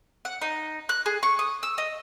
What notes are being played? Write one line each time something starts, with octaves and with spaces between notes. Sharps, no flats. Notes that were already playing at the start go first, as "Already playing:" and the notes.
F#5
D#4
F#6
G#4
C#6
D#6
E6
D#5